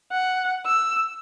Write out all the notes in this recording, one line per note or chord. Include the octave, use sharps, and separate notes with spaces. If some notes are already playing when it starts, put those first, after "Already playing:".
F#5
E6